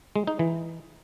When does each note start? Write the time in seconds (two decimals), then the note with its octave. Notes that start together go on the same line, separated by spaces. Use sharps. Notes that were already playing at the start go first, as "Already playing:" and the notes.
0.16 G#3
0.27 D#4
0.39 E3